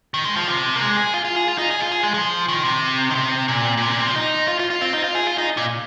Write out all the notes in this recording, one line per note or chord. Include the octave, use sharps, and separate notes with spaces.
D#3
G#3
F3
C3
A#3
G#3
G#4
F4
F4
G#4
F4
D#4
G#4
F4
G#4
G#3
F3
D#3
C3
D#3
C3
A#2
A#2
C3
A#2
C3
F3
D#4
F4
F4
F4
C4
D#4
F4
G#4
F4
D#4
A#2